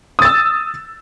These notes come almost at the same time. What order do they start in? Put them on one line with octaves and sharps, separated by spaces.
D#6 A6 E6